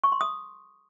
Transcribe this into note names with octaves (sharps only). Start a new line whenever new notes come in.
C#6
C6
D#6